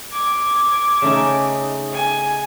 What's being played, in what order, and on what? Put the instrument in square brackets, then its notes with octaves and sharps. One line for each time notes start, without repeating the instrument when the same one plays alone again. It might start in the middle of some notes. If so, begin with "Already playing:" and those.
[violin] D6 G#6
[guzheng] C#3 A3 D#4
[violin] G#5